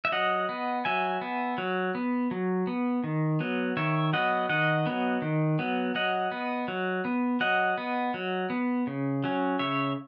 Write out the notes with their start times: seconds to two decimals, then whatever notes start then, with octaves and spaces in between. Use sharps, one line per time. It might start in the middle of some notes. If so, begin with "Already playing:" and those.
0.05 E5
0.12 F#3 D#5 F#5
0.49 B3
0.85 F#3 E5 G#5
1.21 B3
1.58 F#3
1.95 B3
2.31 F#3
2.67 B3
3.04 D#3
3.40 F#3 B3
3.77 D#3 C#5 E5
4.13 F#3 B3 D#5 F#5
4.49 D#3 D#5 F#5
4.87 F#3 B3
5.22 D#3
5.59 F#3 B3
5.95 F#3 D#5 F#5
6.32 B3
6.68 F#3
7.05 B3
7.40 F#3 D#5 F#5
7.78 B3
8.14 F#3
8.50 B3
8.87 C#3
9.24 F#3 C#4
9.59 C#3 C#5 E5